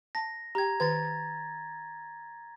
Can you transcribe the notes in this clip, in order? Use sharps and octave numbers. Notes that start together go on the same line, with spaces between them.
A5 A#6
G4 G5 A#5 G#6
D#3 B4 G#6 A6